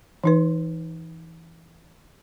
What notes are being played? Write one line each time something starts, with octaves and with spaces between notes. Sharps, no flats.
E3 D#4 B4